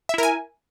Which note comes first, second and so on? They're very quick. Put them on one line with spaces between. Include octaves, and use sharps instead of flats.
E5 E4 A#4 G#5